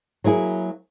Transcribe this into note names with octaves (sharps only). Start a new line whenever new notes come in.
F#3 A#3 E4 G#4